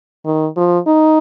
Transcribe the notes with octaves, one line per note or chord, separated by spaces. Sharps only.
D#3
F3
D#4